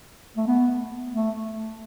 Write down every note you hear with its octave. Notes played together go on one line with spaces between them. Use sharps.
A3
B3
A3